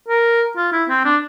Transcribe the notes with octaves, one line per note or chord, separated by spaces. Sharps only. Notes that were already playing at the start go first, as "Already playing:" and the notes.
A#4
F4
E4
C4
D4